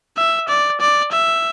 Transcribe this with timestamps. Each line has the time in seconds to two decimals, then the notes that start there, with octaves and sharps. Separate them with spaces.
0.17 E5
0.48 D5
0.80 D5
1.12 E5